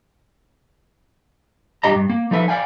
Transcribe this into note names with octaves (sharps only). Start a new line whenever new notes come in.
G2 D4 G4 D#5 A#5
G2
A#3
F3 D#4 A4 B4 E5
D5 F5 G5 G#5